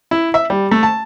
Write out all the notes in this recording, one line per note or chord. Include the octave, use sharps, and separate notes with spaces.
E4
E5
G3
A3
A5